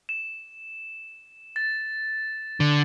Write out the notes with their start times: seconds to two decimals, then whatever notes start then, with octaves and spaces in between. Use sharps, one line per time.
0.09 E7
1.56 A6
2.60 D3